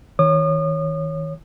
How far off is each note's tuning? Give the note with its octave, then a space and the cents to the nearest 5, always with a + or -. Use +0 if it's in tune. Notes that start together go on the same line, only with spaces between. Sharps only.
D#3 +35 C#5 -5 D#6 -40